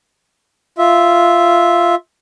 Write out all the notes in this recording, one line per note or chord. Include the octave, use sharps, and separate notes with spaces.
F4 E5